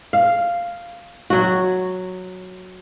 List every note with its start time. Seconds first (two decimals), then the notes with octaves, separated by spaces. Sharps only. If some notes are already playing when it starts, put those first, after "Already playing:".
0.13 F5
1.30 F#3 F#4